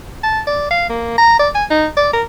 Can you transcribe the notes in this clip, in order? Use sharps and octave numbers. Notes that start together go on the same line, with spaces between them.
A5
D5
F5
A#3
A#5
D5
G#5
D#4
D5
A#4